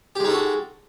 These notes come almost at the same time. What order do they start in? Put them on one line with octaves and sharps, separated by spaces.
G4 G#3 D#4 A4 F#4